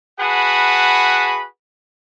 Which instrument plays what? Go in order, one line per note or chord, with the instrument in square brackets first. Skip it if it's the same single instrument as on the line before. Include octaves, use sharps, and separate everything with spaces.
[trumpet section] F#4 G#4 B4 F#5 A5 B5